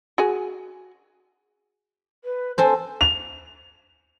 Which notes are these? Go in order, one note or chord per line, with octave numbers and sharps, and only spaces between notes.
F#4 G#4 G#5
B4
C4 A4 C5 G#5
F7